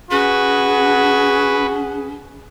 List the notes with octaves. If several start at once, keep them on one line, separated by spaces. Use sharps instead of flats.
C#4 F#4 G#4 B4